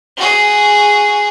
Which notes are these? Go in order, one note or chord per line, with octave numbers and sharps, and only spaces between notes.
F#4 G#4